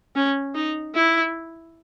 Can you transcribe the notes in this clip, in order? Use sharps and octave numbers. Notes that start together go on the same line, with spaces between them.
C#4
D#4
E4